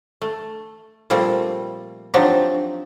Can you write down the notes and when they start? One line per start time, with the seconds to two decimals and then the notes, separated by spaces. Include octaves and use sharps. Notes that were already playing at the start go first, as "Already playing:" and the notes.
0.22 A3
1.10 A#2 F3 G3 A3 C4
2.14 F3 F#3 C4 D4 D#4 G4